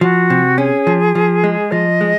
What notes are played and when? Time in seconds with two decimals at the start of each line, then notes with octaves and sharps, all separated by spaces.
0.01 F3 F#4
0.30 C3
0.58 C#4 G#4
0.87 F3
1.15 F3
1.44 G#3
1.72 F3 D#5
2.01 G#3